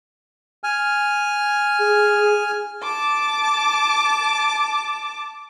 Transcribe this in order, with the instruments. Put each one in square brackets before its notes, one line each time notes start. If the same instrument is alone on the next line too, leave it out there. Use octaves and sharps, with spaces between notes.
[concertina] G#5 F6
[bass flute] G#4
[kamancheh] A5 D6